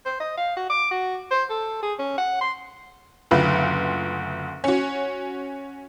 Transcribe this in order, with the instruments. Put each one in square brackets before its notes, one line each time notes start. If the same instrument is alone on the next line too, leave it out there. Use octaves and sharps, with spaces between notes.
[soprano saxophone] C5
D#5
F5
F#4
D6
F#4
C5
A4
G#4
C#4
F#5
C6
[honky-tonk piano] F#1 D2 F4 B4
C#4 F#4